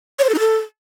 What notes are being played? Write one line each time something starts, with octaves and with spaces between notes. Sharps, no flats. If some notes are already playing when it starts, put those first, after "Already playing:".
C#5
C5
A4
D#4
A4